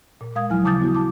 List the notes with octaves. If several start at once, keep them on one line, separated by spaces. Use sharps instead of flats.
A#2
A#2 G#3 F5 D#6 G#6
D#2 F3 F#3 E4 G#5 F6
C#3 A5 D6 D#6 G6 A6
B3 E4 F#4
A5 D6